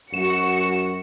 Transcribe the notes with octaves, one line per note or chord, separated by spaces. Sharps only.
F#2 F#4 C#7 E7